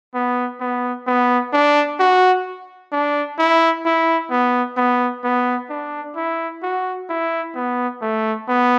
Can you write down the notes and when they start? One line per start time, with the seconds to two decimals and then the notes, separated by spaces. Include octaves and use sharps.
0.14 B3
0.61 B3
1.07 B3
1.53 D4
1.99 F#4
2.92 D4
3.38 E4
3.85 E4
4.31 B3
4.77 B3
5.24 B3
5.70 D4
6.16 E4
6.63 F#4
7.09 E4
7.55 B3
8.02 A3
8.48 B3